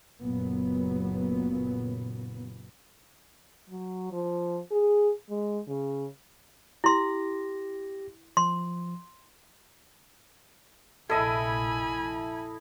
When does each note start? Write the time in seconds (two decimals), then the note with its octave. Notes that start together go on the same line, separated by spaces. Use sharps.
0.22 F#1 A#2 F#3 B3
3.69 F#3
4.12 F3
4.71 G#4
5.30 G#3
5.68 C#3
6.84 E4 G4 C6 A#6
8.37 F3 C6
11.09 F1 A#1 E4 A4 D#5 E5 G#5 B5